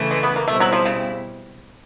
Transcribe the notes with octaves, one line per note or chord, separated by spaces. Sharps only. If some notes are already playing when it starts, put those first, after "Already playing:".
Already playing: C#3 E3 A3
G#3
B3
A#3
B2 G3 A3 C4 E4
F#3
F3
C#3